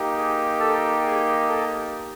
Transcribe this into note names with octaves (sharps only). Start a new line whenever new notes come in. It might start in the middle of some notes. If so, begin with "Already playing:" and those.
Already playing: A#3 D#4 G4
G#4
A4
G#4
A4